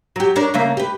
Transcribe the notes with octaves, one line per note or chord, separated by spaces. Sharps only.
F#3 G4
D4 A#4 C#5
C#3 A3 A#3
G4 B4